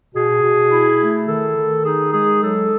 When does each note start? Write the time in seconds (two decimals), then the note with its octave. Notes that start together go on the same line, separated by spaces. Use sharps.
0.13 B2 G#4
0.42 B2
0.70 E4
0.99 A3
1.27 D#3 A4
1.56 D#3
1.84 D#4 G#4
2.12 G#3 G#4
2.41 F#3 A4